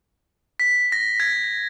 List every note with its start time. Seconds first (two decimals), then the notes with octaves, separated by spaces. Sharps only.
0.60 B6
0.92 A#6
1.20 G#6